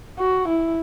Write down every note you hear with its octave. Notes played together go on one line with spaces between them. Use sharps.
F#4
E4